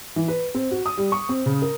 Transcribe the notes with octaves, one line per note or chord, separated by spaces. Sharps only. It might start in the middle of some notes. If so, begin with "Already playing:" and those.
E3
B4
C4
F#4
D#6
G3
C#6
C4
C#3
A#4